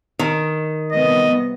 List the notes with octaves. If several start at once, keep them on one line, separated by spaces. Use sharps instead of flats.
D#3
C3 G3 B3 D#5